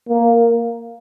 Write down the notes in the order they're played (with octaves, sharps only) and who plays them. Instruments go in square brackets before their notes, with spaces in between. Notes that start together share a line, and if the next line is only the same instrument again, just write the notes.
[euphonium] A#3